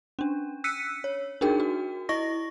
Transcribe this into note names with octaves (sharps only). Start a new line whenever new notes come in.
C#4 D4
E6 F#6 B6 C#7 D#7
C#5
D4 D#4 F#4 G#4 A#4 G5
F#4
E4 D#5 C#6 A#6